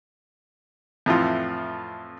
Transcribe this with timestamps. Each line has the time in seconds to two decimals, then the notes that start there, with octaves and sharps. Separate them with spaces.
1.06 F2 A2 E3 F4